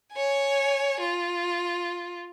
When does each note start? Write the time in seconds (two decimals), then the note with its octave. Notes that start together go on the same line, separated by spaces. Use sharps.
0.13 C#5 G#5
1.00 F4